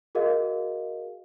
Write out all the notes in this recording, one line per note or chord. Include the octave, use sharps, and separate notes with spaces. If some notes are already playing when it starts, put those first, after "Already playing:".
F#4 G#4 A#4 D#5 F5